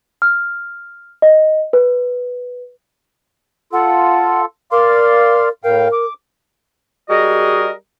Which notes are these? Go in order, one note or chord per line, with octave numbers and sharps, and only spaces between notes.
F6
D#5
B4
F4 A4 F#5
A#4 D5 F5 C6
A2 A#4 F5 G5
D6
G3 F#4 G#4 A#4 D#5